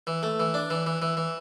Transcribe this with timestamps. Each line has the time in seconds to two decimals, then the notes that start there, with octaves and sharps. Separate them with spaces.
0.07 E3
0.23 A3
0.40 E3
0.54 D4
0.70 E3
0.86 E3
1.02 E3
1.17 E3